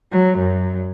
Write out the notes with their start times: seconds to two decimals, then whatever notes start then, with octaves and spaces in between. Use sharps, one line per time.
0.10 F#3
0.39 F#2